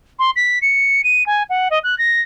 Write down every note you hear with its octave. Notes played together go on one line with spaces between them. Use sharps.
C6
B6
C#7
D#7
G#5
F#5
D#5
F#6
A#6